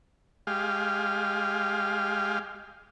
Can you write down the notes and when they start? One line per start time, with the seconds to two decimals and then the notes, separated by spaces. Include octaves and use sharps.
0.47 G#3 G4 F5